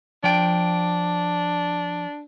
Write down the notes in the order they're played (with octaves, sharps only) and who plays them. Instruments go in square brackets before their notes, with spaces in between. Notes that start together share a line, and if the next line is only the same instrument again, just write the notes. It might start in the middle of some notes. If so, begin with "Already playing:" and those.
[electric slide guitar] F3 G5 [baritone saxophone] D4